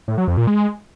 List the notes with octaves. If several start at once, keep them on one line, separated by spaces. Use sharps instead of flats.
A2
F#3
F2
A#2
G#3